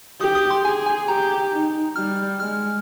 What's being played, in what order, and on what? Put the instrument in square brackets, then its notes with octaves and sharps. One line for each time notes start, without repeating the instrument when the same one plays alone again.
[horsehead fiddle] G4 [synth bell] D#6
[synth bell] D#6
C6
[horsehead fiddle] G#4 [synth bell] G#5
[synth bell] G#5
[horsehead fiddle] G4 [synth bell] A#5
[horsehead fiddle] D#4
[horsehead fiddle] G3 [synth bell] F6
[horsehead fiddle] G#3 [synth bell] F6